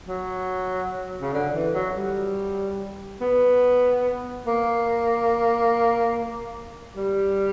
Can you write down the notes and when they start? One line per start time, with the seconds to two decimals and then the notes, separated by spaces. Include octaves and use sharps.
0.08 F#3
1.21 C#3
1.33 D3
1.54 E3
1.74 F#3
1.96 G3
3.21 B3
4.46 A#3
6.96 G3